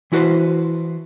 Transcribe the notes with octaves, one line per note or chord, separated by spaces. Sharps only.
E3 E4 F#4 B4 C5